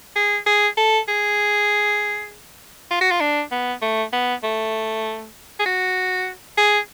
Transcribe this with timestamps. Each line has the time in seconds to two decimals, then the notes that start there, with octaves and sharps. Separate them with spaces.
0.16 G#4
0.46 G#4
0.77 A4
1.08 G#4
2.91 F4
3.01 F#4
3.11 F4
3.21 D4
3.52 B3
3.82 A3
4.13 B3
4.43 A3
5.59 G#4
5.66 F#4
6.57 G#4